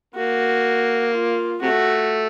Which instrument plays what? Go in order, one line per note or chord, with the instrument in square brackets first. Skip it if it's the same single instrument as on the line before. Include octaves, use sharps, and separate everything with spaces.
[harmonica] A#3 [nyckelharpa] F#4
[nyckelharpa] F4
[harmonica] C3 A3 [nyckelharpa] F#4